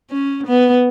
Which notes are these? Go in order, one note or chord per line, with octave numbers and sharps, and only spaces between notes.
C#4
B3